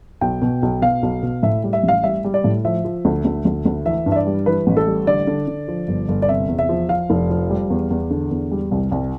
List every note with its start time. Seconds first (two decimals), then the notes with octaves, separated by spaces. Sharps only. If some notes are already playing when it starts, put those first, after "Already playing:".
0.21 B1 G5
0.42 B2
0.62 B1
0.82 B2 F5
1.03 B1
1.23 B2
1.43 A2 E5
1.64 G3
1.73 E5
1.83 A1
1.88 F5
2.03 G3 E5
2.24 G3
2.34 D5
2.44 A2
2.65 F3 E5
2.84 F3
3.05 D2
3.25 D2
3.45 D2
3.66 D2
3.86 E3 E5
4.06 G2
4.12 E5
4.16 D5
4.27 G3
4.46 E3 B4
4.67 A1
4.77 A4
4.87 G3
5.07 D3 D5
5.27 D3
5.48 D3
5.68 F3
5.88 G1
6.09 G1
6.22 D5
6.28 C3 E5
6.48 E2
6.59 E5
6.69 F3
6.89 F3 F5
7.10 F1
7.30 F3
7.50 G3
7.70 E2
7.91 E2
8.11 D3
8.31 E2
8.51 G3
8.71 C2
8.92 C2